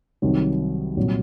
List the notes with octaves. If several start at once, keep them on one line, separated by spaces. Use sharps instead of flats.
C2 C3 D#3 F#3
C2 A#2 F#3